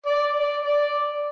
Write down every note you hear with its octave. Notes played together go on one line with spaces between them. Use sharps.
D5
D5
D5